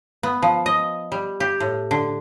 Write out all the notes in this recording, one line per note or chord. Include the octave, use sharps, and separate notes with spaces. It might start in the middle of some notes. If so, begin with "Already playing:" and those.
B3
F3
D#5
G3
G4
A2
D3